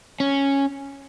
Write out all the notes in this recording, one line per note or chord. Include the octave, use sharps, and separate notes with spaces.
C#4